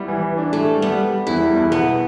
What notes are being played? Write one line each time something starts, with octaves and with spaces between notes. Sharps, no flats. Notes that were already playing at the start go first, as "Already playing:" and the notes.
Already playing: G3 B3 E4
E3
E3
D4
A2 A3
G3
G3 B3
G3
G3
E2 E4
G3
E2
B2 B3